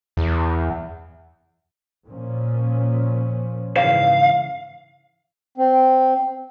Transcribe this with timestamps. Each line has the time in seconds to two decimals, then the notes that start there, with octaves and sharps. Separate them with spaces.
0.17 E2
2.07 A#2 F3 C#4
3.77 G#2 C#3 E3 F5
5.58 C4